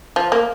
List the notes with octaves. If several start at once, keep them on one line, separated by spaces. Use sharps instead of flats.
F3
A#3